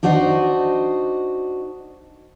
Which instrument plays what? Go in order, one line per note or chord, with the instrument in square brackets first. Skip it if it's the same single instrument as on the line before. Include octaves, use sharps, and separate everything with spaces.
[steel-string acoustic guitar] D4 D#4 F#4 C5 D#5